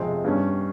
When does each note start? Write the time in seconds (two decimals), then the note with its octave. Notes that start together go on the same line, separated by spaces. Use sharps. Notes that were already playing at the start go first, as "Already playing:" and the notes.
Already playing: F2 C3 F3 G#3 C4 C5
0.24 G2 G3 C#4